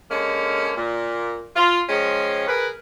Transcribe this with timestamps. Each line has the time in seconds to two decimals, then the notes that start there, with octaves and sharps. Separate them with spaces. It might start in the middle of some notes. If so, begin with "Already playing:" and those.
0.11 D3 G#3 A#3 C#4
0.77 A#2
1.56 F4
1.89 D#3 F3 G#3 C#4
2.48 G#4 A#4 B4